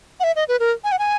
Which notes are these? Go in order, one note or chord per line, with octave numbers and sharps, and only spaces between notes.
F#5
E5
D#5
B4
A#4
G#5
F#5
G#5